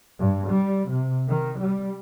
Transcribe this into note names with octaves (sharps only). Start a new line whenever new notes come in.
G2
G3
C3
D#3
G3